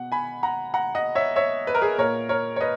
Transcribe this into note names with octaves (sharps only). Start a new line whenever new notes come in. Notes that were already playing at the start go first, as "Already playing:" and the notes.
Already playing: B2 F#5
G#5 B5
F#5 A#5
F#5 A#5
D#5 F#5
C#5 E5
C#5 E5
B4
A#4
G#4 B4
A#2 A#4 C#5
A#4 C#5
C#5
B4 D#5